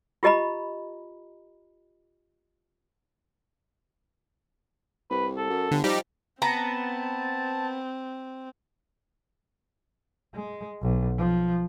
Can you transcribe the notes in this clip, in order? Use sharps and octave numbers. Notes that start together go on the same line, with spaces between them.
F4 G4 D#5 A#5 B5
C2 B4
A4
F#2
G1 D3
F3 G3 D#4 G4
B3 C4 A5 A#5
G#3
B1
F3